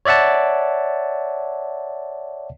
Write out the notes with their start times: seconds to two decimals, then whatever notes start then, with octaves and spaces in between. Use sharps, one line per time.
0.05 C#5 D5 E5 F#5 A5